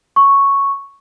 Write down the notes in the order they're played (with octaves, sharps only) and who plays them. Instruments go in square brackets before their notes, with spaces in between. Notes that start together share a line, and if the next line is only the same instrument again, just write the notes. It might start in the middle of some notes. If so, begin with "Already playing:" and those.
[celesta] C#6